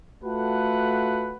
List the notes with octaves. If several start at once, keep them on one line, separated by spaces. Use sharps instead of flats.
A3 F4 F#4 A4 B4 F#5